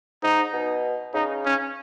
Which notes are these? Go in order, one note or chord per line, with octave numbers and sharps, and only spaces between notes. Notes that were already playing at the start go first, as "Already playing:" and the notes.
G#2 D#4
B2
C#3 D#4
C#4